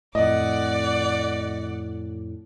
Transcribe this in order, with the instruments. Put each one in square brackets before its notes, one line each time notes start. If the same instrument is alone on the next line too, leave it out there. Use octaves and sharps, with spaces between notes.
[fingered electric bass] F2 A2 [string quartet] D5 F#5 [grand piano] D#5